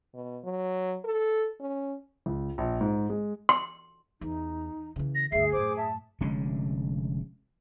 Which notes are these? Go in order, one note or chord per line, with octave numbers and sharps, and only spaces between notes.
B2
F#3
A4
C#4
C#2
A#1
G#2
G#3
C6
E2 D#4
C#3 E3
A#6
D2 G2 G#4 E5 C7
F#2 A2 C5 D6
E5 A5
F1 D3 G#3 C#4